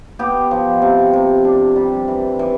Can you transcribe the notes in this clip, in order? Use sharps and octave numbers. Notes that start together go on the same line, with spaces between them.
B3 G4
F3
C3
C3
D4
G3
E3
E3